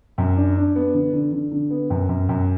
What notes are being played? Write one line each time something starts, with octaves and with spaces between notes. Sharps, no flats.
F#2
D4
D4
B3
D3
D3
D3
D3
B3
F#2
F#2
F#2